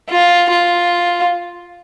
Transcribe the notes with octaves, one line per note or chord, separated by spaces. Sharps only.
F4
F4